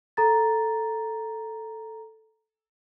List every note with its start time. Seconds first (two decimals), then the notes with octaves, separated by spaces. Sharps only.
0.17 A4 A#5 A6